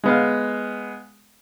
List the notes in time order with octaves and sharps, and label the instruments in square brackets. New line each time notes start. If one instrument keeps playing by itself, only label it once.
[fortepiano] G#3 B3 F5